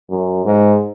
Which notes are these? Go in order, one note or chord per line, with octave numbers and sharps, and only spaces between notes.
F#2
G#2